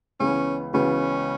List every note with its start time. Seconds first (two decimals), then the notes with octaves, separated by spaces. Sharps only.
0.20 C#2 C#3 E3 B3 C#4
0.73 C#2 C#3 E3 B3 C#4 F#4